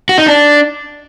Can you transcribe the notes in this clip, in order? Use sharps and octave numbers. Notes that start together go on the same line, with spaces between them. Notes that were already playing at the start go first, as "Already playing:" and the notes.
F#4
D#4
D4